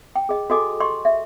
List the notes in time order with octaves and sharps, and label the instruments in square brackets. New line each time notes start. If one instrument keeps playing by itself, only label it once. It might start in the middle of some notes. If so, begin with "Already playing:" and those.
[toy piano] G5
G#4 D#5
F#4 G4 A4 D#5 G#5 D6
G4 D#5 C6 C#6
E5